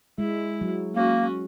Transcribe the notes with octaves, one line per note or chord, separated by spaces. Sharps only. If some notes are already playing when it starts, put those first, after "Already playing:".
G#3 E4
F#3
A#3 C#4 F#4